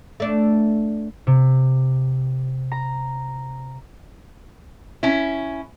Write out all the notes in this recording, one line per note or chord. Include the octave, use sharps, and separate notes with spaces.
A3 D4
C3
A#5
C#4 E4